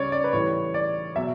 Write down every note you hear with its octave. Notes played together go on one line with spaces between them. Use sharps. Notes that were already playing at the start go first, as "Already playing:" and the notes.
Already playing: C#3 G3 C#5 D5
D5
B4
A2 E3 G3 C#5
D5
B2 F#3 E5